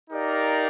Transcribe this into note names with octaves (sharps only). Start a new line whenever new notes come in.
D#4 G4 A#4 D5 F5